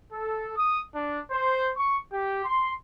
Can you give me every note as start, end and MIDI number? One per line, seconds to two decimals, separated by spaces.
0.13 0.51 69
0.56 0.80 87
0.94 1.18 62
1.31 1.71 72
1.76 1.97 85
2.11 2.43 67
2.45 2.70 84